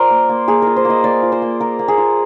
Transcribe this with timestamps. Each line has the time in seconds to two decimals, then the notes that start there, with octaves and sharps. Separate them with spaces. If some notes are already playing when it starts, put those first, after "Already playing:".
Already playing: F4 A#4 C5 D5
0.10 A#3
0.29 A#3
0.48 A#3 G#4
0.62 F4 A#4
0.76 C5
0.85 A#3 D#5
1.04 A#3 D5
1.23 F4
1.32 C5
1.42 A#3
1.61 F4 A#4
1.79 A#3
1.88 G#4
1.98 F4